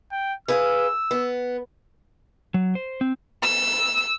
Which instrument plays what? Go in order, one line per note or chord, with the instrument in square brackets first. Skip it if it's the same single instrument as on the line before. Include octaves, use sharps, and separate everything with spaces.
[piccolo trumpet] G5
[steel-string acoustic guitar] G#4 B4 F5 [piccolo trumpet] E6
[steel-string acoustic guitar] B3
[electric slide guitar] F#3
C5
C4
[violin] E6